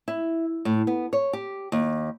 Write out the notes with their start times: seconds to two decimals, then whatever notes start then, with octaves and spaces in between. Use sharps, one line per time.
0.08 E4
0.65 A2
0.87 B3
1.13 C#5
1.33 G4
1.72 D#2